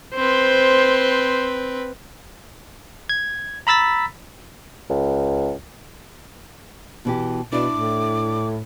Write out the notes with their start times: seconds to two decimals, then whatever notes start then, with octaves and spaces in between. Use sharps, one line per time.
0.16 C4 B4 C5
3.09 G#6
3.67 A#5 B5 E6 A6 B6
4.89 C#2
7.05 B2 E3 G4
7.52 B2 D4 E4 D6
7.74 A2